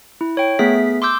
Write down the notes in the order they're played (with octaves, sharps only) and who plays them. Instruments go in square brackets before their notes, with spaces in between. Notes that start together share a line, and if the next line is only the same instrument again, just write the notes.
[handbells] E4
C#5 G5
A3 B3 G#4 E5 B6
C6 D6 E6 G6